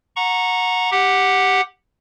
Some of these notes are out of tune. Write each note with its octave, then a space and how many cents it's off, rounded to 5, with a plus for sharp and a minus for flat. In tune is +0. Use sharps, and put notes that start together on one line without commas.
F#5 -20 A#5 +0 C#6 +0
G4 +0 F#5 +0